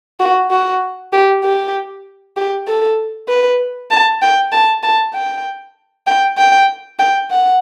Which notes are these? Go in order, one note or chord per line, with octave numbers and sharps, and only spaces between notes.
F#4
F#4
G4
G4
G4
A4
B4
A5
G5
A5
A5
G5
G5
G5
G5
F#5